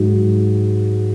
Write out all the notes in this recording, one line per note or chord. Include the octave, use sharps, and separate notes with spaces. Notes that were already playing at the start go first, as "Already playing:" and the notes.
Already playing: G#2 F#3